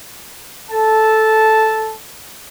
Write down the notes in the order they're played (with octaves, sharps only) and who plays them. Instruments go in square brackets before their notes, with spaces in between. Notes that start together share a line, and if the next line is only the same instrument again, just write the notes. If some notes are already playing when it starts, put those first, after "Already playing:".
[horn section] A4 A5